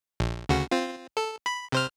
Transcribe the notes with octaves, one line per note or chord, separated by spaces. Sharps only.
A#1
D2 C#3 F#4
C4 F4
A4
B5
C3 C5 F6